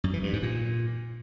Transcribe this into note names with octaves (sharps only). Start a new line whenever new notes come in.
F#2
E3
G2
G#2
A#2